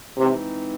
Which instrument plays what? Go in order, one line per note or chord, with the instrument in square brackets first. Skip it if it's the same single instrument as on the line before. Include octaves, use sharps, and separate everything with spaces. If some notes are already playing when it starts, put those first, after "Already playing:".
[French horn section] C3 [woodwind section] E3 G#3 C4 D#4